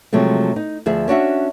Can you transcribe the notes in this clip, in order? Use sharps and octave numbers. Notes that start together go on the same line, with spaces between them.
C3 F3 F#3 G#3 A3
D#4
D2 F3 G#4 E5
C#4 D4 F#4 E5